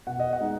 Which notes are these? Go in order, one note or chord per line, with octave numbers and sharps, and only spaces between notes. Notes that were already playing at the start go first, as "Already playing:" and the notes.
B2 F#5
D#5
F#5
G#3 B3 D#4